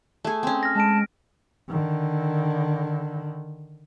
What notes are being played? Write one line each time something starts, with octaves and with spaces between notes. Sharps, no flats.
A3 G#4
C4 C#4
F6 A#6
G#3 A5 F6 D7
D3 D#3